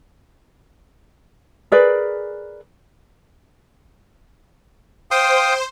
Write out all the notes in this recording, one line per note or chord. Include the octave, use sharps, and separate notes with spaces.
G#4 A#4 B4 D5
C5 F5 G5 D#6